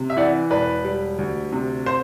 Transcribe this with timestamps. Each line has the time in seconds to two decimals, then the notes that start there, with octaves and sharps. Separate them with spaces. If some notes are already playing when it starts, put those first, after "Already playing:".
Already playing: C3
0.10 E5
0.17 E3 D5 F#5
0.50 E1 B4 D5
0.85 G3
1.19 D2
1.53 C3
1.86 C5